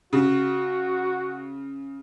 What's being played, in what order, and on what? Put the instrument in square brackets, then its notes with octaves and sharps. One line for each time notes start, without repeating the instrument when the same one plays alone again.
[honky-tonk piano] C#3 [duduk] F#4